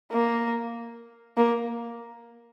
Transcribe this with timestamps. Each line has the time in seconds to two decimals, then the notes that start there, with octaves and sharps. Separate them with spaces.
0.12 A#3
1.37 A#3